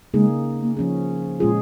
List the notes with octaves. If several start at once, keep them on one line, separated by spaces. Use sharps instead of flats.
C#3 G#3 A#3 D#4 G#4
A#3
F3 C#4 G#4
A#2 G#3 C#4 F4 G#4